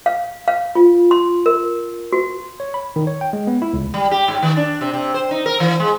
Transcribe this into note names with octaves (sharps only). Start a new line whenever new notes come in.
F5
F5
F4
C6
A#4
F#4
C#5
B5
D#3
C#5
G5
G#3
B3
E4
C#2
G3
G4
G#2
D#3
D4
C3
C3
C5
D#4
A#4
E3
G#3